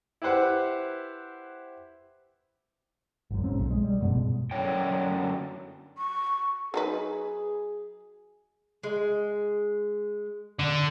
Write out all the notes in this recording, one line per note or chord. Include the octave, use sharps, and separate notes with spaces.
E4 G4 B4 C5 F#5
G#1 F#2
A#1 G#2 C4 C#4
B1
G#3
G3
F#1 G2 B2 G#3
F#2 D3 F#3 C#5 G5
C#6
F#3 D#4 G#4 B4
G#3
D3